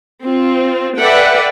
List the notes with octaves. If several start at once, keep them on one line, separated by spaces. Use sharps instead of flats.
C4 F4
A4 B4 D5 E5 F#5 G5